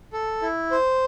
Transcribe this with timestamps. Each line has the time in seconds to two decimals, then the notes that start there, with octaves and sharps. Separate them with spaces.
0.13 A4
0.42 E4
0.71 C5